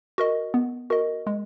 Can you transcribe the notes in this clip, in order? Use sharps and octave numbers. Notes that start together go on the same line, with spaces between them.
F#4 A#4 D#5
B3
F#4 A#4 D#5
G#3